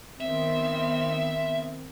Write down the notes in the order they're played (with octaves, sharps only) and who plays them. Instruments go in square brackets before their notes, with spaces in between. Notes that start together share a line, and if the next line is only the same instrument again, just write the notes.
[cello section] D#3 B3 C4 [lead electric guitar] E5